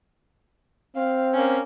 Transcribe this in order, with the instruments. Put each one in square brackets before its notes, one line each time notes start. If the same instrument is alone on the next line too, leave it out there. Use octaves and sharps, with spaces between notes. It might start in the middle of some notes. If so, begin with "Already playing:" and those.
[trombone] C4 [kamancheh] F5
[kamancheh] A#3 C#4